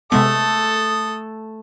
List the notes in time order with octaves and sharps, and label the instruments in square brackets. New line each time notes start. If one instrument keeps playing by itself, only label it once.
[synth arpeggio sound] C3 G#3 B3 [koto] A3 [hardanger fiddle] A4 [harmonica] D#6